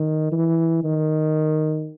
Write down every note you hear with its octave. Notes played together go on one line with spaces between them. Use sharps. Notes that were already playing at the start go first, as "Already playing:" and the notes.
Already playing: D#3
E3
D#3